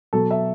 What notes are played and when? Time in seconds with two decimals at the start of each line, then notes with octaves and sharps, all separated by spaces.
0.13 B2 F#3 A4
0.31 E5